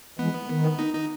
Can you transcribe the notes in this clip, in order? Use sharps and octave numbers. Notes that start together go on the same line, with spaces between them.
E3 G#3 B3
D#3
D#4
D#4